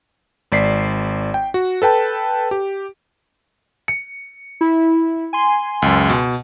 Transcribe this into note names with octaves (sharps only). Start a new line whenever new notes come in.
G#1 D5 B6 C7
G5
F#4
A4 B4 G5 A5
G4
C#7
E4
G#5 C6
C#2 F#2
B2